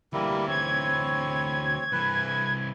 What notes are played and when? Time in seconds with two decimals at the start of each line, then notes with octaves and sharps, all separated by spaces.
0.13 D2 E3 G3 A#3 E4
0.47 C4 C#5 G#6
1.92 C2 E3 B4